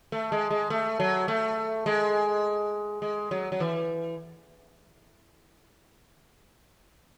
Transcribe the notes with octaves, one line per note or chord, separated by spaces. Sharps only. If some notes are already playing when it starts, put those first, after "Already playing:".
A3
G#3
G#3
A3
F#3
A3
G#3
G#3
F#3
F#3
E3